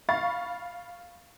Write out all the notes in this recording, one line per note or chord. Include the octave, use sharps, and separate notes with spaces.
F5 B5 C#6 A6